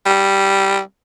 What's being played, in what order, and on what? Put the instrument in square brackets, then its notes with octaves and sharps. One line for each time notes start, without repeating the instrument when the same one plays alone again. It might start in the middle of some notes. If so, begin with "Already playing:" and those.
[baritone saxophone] G3